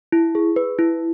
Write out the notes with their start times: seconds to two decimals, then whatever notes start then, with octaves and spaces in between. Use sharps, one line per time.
0.12 E4
0.35 G#4
0.56 B4
0.79 E4